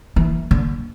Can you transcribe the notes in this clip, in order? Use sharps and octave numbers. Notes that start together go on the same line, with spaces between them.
E3
D3